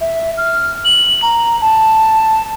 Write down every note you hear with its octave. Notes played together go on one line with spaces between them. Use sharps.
E5
F6
F#7
A#5
A5